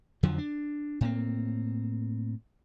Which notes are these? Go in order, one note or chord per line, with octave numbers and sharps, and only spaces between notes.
F2 D3 F3 F#3
D4
A2 A#3 C4